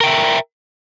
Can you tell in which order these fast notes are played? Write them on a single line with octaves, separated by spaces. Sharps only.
A#4 G5 E5